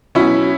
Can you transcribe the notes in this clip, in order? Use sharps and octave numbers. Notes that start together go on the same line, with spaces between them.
B2 F#3 C#4 E4